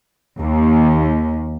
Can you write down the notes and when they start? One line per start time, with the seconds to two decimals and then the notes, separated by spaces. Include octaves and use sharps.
0.39 D#2